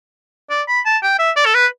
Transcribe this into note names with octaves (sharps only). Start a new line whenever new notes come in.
D5
B5
A5
G5
E5
D5
A4
B4